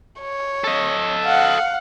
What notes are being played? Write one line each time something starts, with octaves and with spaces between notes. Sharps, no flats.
C#5
A4 D#5
F5 F#5